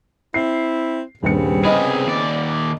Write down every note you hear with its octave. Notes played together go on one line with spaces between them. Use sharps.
C4 E4 C7
D#1 G2 C#3 B3 C4 C#7
C2 G#4 D#5 B5
D#2 D5